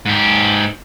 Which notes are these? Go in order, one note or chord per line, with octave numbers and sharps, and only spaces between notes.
G#2 G4